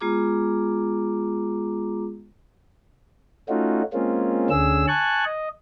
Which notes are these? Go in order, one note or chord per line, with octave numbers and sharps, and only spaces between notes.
G#3 B3 F4 G#4 A#5 D6
A3 C#4 D#4 F4 F#4
G#3 A#3 C4 C#4 F4
D2 D3 C#4 G#4 E6
G#5 A5 C#6 F#6
D#5